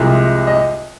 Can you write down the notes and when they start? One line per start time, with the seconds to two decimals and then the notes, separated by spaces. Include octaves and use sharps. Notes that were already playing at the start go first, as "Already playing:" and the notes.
Already playing: C2 C3 F3 G#3 D#5
0.47 D#5